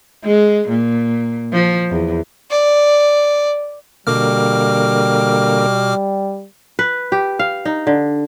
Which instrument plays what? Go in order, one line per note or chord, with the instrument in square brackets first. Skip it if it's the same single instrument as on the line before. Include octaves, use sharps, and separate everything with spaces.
[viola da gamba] G#3
A#2
F3
E2
[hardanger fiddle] D5
[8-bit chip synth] B2 D6 F6 [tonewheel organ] D3 A#3 A#4 [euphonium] G3
[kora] B4
G4
F5
D#4
D3